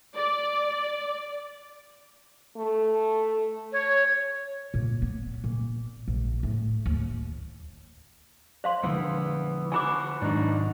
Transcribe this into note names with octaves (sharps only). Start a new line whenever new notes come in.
D5
A3
C#5
A#2
B3
A#2
A#1
A2
D#2
C5 F5 C6
D3 E3 F3 G#3 B3
E3 F#4 B4 G#5 B5 D6
G#2 D#3 F#3 D4 D#4 F#4